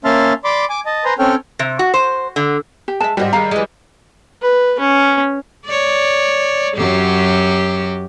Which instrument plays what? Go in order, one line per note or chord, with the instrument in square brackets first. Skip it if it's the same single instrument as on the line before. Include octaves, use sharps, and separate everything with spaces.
[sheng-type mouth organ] A#3 C#4 E5 A5 C6 F6
D5 B5 C6 D6
G#5 D6
D#5 A5
B4 C5 G#5 A#5 C6
C4 C#4 A4 C#5 G5 F6
[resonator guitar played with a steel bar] C3
F#4
C5
D3
[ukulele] G4
[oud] G#3 E5 [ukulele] A5
[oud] G#2 F#4 [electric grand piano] G3 [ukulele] G4 C5 D#5
[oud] D#3 G#3 D#4 [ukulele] F5 A#5
[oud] E3 G#3
[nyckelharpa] B4
C#4
[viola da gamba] C#5 D5
F#2 F#3 G4